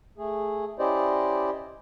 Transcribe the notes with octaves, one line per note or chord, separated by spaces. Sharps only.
A3 G#4
C#4 E4 G4 C5 D5 D#5